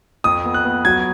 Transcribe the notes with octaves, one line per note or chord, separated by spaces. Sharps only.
F2 D#6
B3
F#6
B3
F#3 G#6